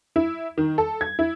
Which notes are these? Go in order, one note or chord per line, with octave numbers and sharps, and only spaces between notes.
E4
D#3
A4
G#6
E4